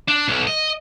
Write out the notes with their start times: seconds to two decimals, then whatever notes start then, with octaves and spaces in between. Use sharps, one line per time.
0.08 D4
0.28 B1
0.47 D#5